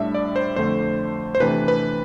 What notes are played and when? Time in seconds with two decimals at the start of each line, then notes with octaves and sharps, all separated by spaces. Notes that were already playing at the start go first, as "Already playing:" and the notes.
Already playing: A2 G3 D4 E5
0.14 D5
0.36 C5
0.56 F2 D3 A3 C5
1.35 C5
1.40 C3 E3 A3 D4 B4
1.68 B4